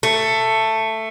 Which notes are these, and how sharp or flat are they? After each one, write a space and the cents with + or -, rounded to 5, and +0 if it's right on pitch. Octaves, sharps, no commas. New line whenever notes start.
A3 +10